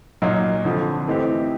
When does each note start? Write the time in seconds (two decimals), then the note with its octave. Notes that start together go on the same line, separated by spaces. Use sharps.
0.22 A#2 F#3 A#3 D#4
0.65 F2 D3 F3
1.07 E3 A3 C4 D#4 G4